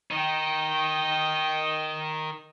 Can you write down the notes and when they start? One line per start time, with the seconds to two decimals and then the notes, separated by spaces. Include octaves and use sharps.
0.11 D#3 D#4 D#5 G5